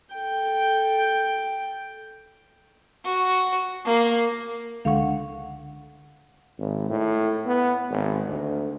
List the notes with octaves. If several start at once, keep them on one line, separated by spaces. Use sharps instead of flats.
A4 G5
F#4
A#3
C#2 D3 F5 F#5 C#6
G#1
A2
B3
G#1
D2